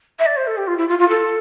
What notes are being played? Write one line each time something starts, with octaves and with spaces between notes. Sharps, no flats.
E5
D5
C5
A4
G4
F4
E4
F4
F4
A4